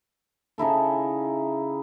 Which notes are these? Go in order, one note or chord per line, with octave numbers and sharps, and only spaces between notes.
C#3 D#4 E4 A4